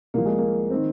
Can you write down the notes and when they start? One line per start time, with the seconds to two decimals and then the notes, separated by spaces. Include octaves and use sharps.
0.14 C2 C3 F3 A#3
0.26 G#3
0.38 A#3
0.70 D#3 C4